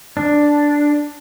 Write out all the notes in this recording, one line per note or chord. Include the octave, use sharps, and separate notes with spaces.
D4